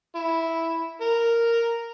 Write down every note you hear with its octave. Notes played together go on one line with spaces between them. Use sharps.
E4
A#4